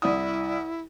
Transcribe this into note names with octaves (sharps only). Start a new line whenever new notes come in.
C2 E4 D5 D#6